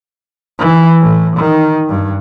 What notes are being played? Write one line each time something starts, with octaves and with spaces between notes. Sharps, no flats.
E3
A2
D#3
G2